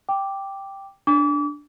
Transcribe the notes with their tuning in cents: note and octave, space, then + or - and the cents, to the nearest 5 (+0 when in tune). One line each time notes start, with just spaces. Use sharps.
G5 +0 D6 +0
D4 +0 D6 -35